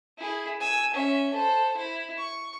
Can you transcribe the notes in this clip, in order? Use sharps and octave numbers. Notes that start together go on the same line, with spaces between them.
E4 G#4
G#5 E6
C#4 E5
A4 C5
E4
C#6